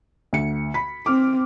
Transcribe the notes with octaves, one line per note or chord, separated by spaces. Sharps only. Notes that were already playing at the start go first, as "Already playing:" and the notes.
D2 C#7
B5 B6
C4 D6 F6